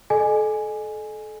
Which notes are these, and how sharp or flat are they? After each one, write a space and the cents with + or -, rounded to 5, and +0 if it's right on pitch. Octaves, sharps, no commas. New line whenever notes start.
A4 -30 D#5 -40 G#5 +0